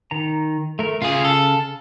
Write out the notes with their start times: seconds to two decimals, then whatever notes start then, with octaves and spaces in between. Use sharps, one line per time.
0.11 D#3 A#5
0.79 A3 A#4
1.02 C#3 F4 G#4 F5
1.25 A4